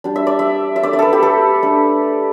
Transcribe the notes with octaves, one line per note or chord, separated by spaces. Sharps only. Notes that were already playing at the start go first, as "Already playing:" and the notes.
G3 D4
E5
D5
E5
E5
A3 D4 D5
D5
A4 B4
G4
A4
A3 D4